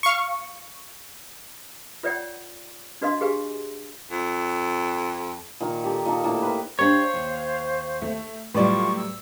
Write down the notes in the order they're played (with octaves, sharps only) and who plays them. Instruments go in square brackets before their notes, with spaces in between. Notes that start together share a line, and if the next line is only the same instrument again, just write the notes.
[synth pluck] F5 C#6
[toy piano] F4 B4 C#5 D5 F#5 G5
D4 F#4 B4 D#5 F5 C6
G4 G#4 B4 F5 G#5
[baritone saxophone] F2
[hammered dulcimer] A#2 D#3 A#4
G4 A4
A#2 A#3 D#4 A4
A2 A#3 G5 A5
A#4 B4
[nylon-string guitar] D4 G4 [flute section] C5 F5 [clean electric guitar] C#5
[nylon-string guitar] D#2
[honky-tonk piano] A3
[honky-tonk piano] A2 D5 [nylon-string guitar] F#3 G3 B4 [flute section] F4 C#6
[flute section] E6